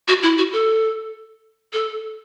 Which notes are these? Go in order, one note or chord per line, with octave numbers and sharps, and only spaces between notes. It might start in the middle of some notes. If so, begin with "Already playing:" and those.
F#4
E4
F#4
A4
A4